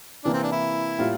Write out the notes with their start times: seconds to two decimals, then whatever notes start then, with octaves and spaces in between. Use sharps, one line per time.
0.25 C3 E3 A#3 D4
0.33 C4
0.43 D4
0.52 E4
0.98 A2 G3 A#3 F4